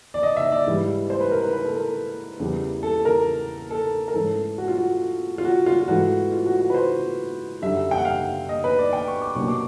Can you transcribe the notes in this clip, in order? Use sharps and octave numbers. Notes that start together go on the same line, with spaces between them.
D5
D#5
E5
D5
G#2 E3 G3
C5
B4
A#4
B4
B4
A4
A#4
E2 C#3 E3 G3
A4
A#4
A4
A#4
G#2 E3 A3 C#4 A4
F#4
F4
F#4
F4
F#4
F4
F4
G#2 E3 A3 F#4
F4
F#4
F#4
B4
C5
F#2 D3 G3 E5
G5
F#5
F5
D#5
B4
D5
G5
C#6
D6
C2 B2 F#3 A#3 D4 C#6
D6